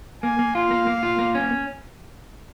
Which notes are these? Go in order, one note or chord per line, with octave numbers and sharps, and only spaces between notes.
A#3 G#5
A#3
F4 F5
A#3
A#3
F4
A#3
C#4